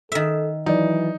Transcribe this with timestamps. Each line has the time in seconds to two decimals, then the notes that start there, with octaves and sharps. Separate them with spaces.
0.12 D#3 A4 E5
0.66 E3 F#3 D#4 D5